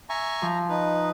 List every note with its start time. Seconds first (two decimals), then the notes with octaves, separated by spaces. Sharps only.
0.10 E5 G#5 A#5 C#6
0.42 F3
0.70 D#4 B4